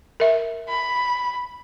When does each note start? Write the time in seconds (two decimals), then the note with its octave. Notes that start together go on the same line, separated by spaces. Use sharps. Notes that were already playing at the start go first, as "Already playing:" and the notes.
0.20 A#4 E5
0.68 B5